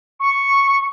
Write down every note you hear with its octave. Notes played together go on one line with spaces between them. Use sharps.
C#6